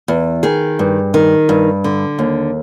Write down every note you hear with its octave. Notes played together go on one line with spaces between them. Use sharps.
E2
D#3 G#4
G2
D#3
G2
D3
D#2